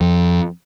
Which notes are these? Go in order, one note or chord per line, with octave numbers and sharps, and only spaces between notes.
F2